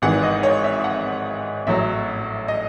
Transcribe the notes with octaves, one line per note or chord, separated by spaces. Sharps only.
G#1 G#2 E3 F#5
D#5
C#5
E5
F#5
A1 A2 F#3 E5
D#5